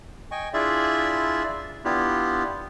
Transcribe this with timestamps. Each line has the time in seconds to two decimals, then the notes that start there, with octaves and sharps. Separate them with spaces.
0.31 D#5 G5 G#5 C#6
0.53 D4 E4 F4 G#4 D5 E5
1.84 B3 D4 E4 F4 G4